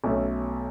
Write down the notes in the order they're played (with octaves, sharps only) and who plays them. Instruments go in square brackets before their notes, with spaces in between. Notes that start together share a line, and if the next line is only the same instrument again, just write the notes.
[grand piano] B1 B2 A3 C#4